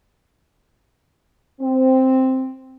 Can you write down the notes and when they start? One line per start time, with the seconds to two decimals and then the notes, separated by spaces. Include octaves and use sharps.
1.61 C4